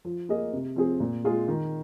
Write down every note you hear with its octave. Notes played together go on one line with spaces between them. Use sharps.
F3
A#3 G#4 D#5
C3
F3 C4 G#4
A#2
G#3 F4 G#4
D#3